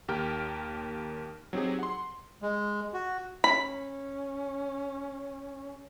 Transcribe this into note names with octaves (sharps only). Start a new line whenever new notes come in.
D#2 G4 A#4 G5 F6
F#3 C4 D#4 G4 G#4
F#5 C6
G#3
F#4
C#4 B5